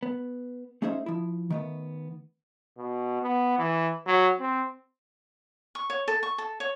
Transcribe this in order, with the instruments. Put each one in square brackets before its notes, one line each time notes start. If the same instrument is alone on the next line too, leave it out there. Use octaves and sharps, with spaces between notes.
[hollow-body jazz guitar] B3
A3 C#4 D#4 G#4 C5 E5
F3 E4
D#3 A3 B3
[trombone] B2
B3
E3
F#3
C4
[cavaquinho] C#6
C#5
A4
C#6
A4
C#5